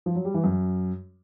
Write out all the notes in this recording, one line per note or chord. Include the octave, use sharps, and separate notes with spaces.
F3
F#3
G3
E3
F#2